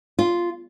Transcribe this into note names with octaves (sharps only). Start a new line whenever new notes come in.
F4